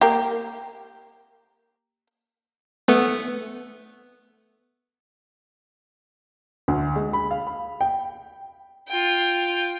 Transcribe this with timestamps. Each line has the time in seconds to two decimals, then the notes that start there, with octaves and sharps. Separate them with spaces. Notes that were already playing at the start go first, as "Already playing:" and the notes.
0.01 A#3 G4
2.88 A3 B3
6.68 D2
6.96 G#3
7.13 B5
7.31 F5
7.47 B5
7.81 G5
8.88 F4 G5